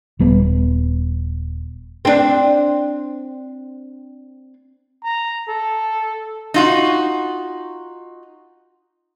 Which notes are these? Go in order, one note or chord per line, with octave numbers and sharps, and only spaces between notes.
D#1 G3 B3
C4 D4
A#5
A4
D#4 F4 F#4